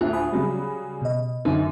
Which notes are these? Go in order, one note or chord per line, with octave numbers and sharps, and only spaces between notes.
D2 A2 F4
G#5 B5 D#6
C#3 F#3 G3
B2 D#5
F#2 D3 D#4